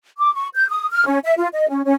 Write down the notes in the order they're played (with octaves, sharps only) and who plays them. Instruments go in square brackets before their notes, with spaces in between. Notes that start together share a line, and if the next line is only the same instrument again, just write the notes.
[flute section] D6
C#6
G6
D#6
F6
C#4
E5
F4
D#5
C#4
C#4